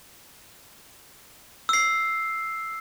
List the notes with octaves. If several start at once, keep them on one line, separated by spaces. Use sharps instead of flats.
E6 C7